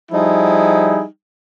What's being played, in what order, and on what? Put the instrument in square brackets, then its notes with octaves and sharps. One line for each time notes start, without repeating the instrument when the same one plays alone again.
[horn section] F3 G3 D#4 E4 G#4